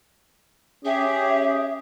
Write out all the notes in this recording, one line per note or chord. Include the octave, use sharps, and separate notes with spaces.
C#4 G4 G#4 E5